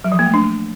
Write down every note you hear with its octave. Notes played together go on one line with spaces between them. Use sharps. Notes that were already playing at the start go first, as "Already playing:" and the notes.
F#3
F3
A#3
A3
D4